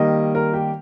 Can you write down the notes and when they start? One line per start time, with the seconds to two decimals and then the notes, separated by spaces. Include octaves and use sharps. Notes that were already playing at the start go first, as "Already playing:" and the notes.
Already playing: D#3 G3 A#3 D#5
0.35 A#4
0.54 G4